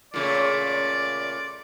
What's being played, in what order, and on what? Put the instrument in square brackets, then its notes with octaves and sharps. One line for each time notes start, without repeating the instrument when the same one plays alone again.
[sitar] A#2 C#3 A3 [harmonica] D5